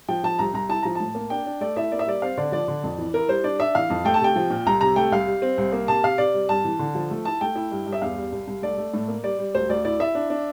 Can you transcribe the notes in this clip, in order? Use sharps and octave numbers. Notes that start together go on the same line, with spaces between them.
F3 G5
F3 A5
C2 A#5
C2 A#5
E4 A5
F3 A#5
A2 A5
A#3
D4 G5
D4
A3 D5
E4 E5
A#3 D5
E5
G3 D5
C4 F5
D3 D5
F3 D5
D3
F2
E3
E4 A#4
G3 C5
D4 D5
D4 E5
E3 F5
F2
A3 G5
A5
C3 G5
F3
A#2
C2 A#5
C3 A#5
A3 G5
C2 F5
G3
C4
C2
A#3
C3 A5
C3 F5
C3 D5
G3
G2 A5
E3
D3
F3
A3
E4 A5
A3 G5
E4
G2
G2
E5
E2 F5
G3
C2
C2
A3 D5
A3
A2
A#3
G3 D5
G3
D2 C5
D2 D5
E4 D5
E4 E5
D4
D4